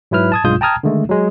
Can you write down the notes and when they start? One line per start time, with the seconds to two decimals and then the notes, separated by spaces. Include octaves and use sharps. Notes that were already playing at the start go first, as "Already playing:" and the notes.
0.11 G#2 F#3 E4 B4 F6
0.32 A5 D#6 G#6
0.44 B1 G2 G#3 F4 D#6 G6
0.61 G5 A5 A#5 D#6 F6 G#6
0.83 D3 D#3 G#3 A3
1.09 F#3 G#3